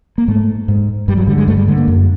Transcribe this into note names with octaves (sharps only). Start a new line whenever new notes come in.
A#3
G#2 A3
G#2
G2 G3
F#3
D3 G3
G#3
G2 A3
G3
D3 G#3
A#3
F#2